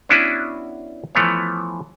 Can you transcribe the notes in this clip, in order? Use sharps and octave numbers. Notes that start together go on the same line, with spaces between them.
B3 C#4 D4 E4 F#4 B4
E3 F3 A3 B3 C#5